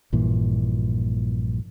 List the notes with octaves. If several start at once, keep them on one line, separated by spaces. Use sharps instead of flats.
A#1 G2 A#2 E3